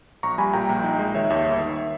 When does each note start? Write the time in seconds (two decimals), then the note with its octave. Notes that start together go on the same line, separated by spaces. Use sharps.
0.23 A#1 A#5 C#6
0.38 G3 G#5 B5
0.54 A#2 G5 A#5
0.69 A#1
0.84 D#4
0.99 G#3
1.14 D#3 C#5 E5
1.30 D#2 C#5 E5
1.45 G1
1.60 D#3